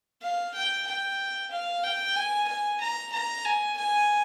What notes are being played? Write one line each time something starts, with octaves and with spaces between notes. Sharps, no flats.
F5
G5
G5
F5
G5
G#5
G#5
A#5
A#5
G#5
G#5